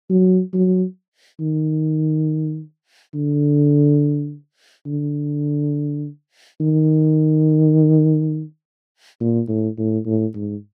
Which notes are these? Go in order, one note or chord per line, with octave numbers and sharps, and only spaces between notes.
F#3
F#3
D#3
D3
D3
D#3
A#2
A2
A2
A2
G#2